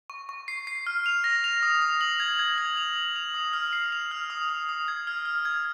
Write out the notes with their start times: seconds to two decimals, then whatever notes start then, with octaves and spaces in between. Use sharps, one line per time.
0.10 C#6
0.29 C#6
0.48 C7
0.67 C7
0.87 F6
1.06 F7
1.24 A#6
1.44 F7
1.63 D#6
1.82 D#6
2.01 F#7
2.20 G#6
2.39 G#6
2.58 F#7
2.77 F7
2.96 F7
3.16 F7
3.34 D#6
3.53 F6
3.73 C7
3.92 F7
4.11 F6
4.30 D#6
4.49 D#6
4.69 D#6
4.88 G#6
5.07 F6
5.25 F6
5.45 G#6